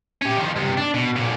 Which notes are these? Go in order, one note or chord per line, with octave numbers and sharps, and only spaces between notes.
C#4 G4
D#3 F3
G2 C3
D4
B2
B1 A#2